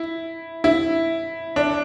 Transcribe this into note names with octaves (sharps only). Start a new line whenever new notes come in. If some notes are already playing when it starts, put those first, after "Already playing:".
Already playing: E4
E4
D4